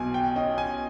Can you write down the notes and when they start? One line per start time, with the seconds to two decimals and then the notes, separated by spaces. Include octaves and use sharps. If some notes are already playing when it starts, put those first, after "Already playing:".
Already playing: B1 B2 G#5
0.14 G5
0.36 C#4 D#5
0.58 G#5